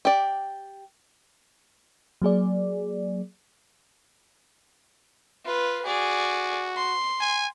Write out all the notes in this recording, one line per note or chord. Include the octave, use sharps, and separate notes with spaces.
G4 D5
F#3 A#3 G#4 D5
F4 B4
F#4 G#4 D5
C6
G#5